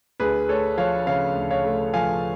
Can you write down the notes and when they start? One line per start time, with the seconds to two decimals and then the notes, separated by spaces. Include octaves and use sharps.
0.20 D2 G#4 B4
0.49 A3 A4 C#5
0.78 F3 C#5 F5
1.06 C#3 C#5 F5
1.36 D2
1.51 C#5 F5
1.65 A3
1.94 F3 F5 G#5